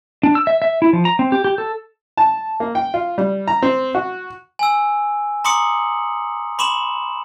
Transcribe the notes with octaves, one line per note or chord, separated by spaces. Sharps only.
D4
E6
E5
E5
E4
F3
A#5
C4
G4
G4
A4
A5
A#3
G5
F4
G3
A#5
C4
F#4
G#5 E6
A#5 C6 D6 D#6 C#7 F#7
B5 C6 D6 E7 F#7